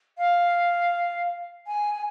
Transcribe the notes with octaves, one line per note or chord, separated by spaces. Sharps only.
F5
G#5
G#5